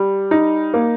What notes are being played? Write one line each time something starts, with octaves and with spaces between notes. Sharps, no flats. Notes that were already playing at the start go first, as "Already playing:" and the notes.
Already playing: G3
D#4
A#3